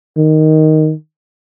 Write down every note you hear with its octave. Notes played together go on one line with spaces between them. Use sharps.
D#3